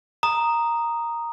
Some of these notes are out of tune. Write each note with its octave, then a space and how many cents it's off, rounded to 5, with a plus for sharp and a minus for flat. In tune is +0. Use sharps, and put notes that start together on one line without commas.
A#5 +0 D#6 -5